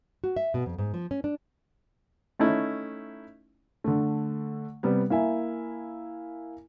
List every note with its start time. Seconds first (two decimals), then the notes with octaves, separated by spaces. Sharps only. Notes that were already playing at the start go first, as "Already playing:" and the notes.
0.24 F#4
0.36 E5
0.54 B2
0.66 F2
0.78 G#2
0.94 F3
1.11 C#4
1.24 D4
2.39 A3 C#4 D#4 E4
3.84 D3 A3
4.83 C3 G3 B3
5.10 A#3 E4 E5 G#5